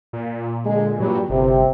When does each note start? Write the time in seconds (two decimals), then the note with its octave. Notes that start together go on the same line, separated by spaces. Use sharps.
0.13 A#2
0.65 D3 G#3 G#4
1.00 G2 A#2 F#3 G3
1.30 G1 C3